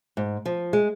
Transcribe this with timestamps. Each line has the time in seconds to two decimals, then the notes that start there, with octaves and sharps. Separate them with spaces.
0.17 G#2
0.46 F3
0.73 G#3